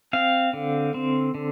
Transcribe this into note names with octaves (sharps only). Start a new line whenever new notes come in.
C4 F5
D3
C4
D3